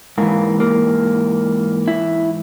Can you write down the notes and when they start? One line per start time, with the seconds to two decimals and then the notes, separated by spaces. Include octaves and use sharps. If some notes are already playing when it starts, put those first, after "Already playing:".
0.18 G#2 E3 A#3
0.60 A#3
1.88 E4